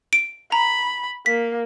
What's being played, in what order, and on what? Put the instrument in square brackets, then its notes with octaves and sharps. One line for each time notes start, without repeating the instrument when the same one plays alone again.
[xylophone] D7
[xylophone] A#5 [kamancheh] B5
[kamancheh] A#3 [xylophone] B6